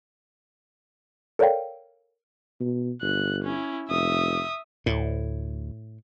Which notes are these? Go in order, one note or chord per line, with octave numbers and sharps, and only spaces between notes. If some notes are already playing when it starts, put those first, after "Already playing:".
A4 A#4 C#5 D5 F5 G5
B2
G1 F#6
C#4 E4
F1 E5 D#6
D2 A2